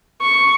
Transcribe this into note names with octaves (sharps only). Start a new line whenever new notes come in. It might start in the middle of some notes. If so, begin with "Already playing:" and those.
C#6